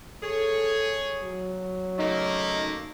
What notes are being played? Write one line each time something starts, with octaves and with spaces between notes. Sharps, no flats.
G#4 A4 C#5
F#3
C#3 A3 A#3 D#4